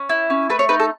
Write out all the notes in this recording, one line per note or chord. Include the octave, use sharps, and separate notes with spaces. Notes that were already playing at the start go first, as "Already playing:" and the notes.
Already playing: C#4
E4
C#4
A3 B4
C#5
D#4 B4
A4